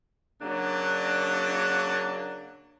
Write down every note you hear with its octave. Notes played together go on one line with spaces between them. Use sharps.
C#3 F#3 A#3 D4